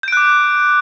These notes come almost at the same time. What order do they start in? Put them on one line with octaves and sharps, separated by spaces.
G6 D7 F#6 D6